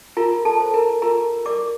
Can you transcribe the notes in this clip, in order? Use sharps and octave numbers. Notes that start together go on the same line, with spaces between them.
F4 A#4 A#5
A4 A5
C5
A#4 A#5
F4 A#4 A#5
A#4 D5 D6